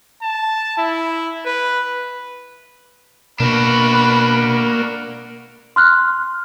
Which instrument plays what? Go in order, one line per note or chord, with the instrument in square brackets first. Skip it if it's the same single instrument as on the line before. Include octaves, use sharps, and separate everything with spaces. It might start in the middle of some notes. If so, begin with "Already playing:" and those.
[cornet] A5
E4
B4
[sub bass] B2 [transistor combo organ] A#3 [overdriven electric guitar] D4 F#4 [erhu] B4
[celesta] C6 F6 F#6